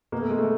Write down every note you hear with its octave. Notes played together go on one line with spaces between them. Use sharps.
B2 A#3
A3
G#3
A3